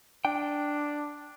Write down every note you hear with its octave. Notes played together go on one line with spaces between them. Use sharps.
D4 G5